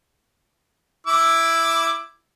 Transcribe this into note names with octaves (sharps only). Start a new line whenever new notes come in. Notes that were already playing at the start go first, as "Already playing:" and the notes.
E4 D6 E6